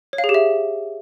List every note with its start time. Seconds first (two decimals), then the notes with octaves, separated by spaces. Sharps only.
0.13 C#5
0.18 F5
0.24 G#4
0.29 G4
0.34 E5